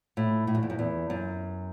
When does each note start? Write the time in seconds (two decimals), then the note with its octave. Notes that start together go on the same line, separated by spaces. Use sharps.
0.17 A2
0.47 A2
0.55 F#2
0.63 E2
0.70 F#2
0.79 E2
1.10 F#2